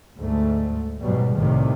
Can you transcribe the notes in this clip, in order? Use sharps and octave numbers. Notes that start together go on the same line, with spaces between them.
D2 G#2 A3
G#2 B2 F#3 G3
C2 A2 C3 D#3